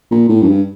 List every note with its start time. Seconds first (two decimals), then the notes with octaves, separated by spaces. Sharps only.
0.11 A#2
0.29 A2
0.42 F#2
0.48 G2